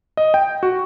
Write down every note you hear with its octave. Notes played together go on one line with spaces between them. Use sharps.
D#5
G5
F#4